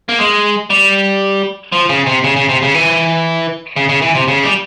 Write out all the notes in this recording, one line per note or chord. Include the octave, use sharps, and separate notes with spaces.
A#3
G#3
G3
F3
C#3
C3
C#3
C#3
C3
C#3
E3
C#3
C#3
E3
C3
C#3
G3